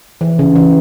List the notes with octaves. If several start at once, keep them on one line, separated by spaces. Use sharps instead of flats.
E3
C#3
E3